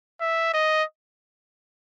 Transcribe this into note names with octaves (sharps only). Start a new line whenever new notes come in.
E5
D#5